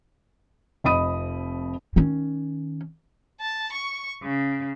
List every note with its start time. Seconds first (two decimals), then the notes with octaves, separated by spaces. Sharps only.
0.84 F1 F2 D#5 B5 D#6 D#7
1.96 D#3 C#4
3.41 A5
3.72 C#6
4.23 C#3